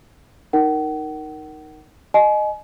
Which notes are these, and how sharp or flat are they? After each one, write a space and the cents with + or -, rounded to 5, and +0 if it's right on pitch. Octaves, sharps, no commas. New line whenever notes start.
D#4 +0 A#4 +0 F#5 +40
D#5 -15 G#5 +35